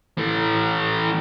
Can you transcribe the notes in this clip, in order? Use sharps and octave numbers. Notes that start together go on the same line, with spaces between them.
E3 A3